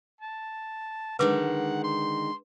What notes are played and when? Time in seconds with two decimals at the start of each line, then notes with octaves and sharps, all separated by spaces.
0.21 A5
1.19 D3 D#3 G#3 B4 F#5 D6
1.84 C6